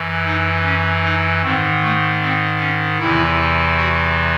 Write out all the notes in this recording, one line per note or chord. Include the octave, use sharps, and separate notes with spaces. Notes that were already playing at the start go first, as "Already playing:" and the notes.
Already playing: F#2 E3
D#4
C#4
D#4
G#2 D#3 C4
A3
C4
C#4
E2 C3 E3 E4
F#4